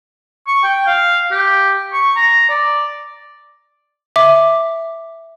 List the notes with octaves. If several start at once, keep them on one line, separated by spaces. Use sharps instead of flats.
C#6
G5
F5
G4
C#6
A#5
D5
E5 D6